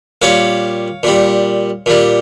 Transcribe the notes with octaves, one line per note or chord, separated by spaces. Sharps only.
A#2 G3 C#5 F5
A#2 G3
A#2 G3